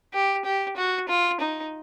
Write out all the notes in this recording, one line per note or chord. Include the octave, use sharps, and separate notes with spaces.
G4
G4
F#4
F4
D#4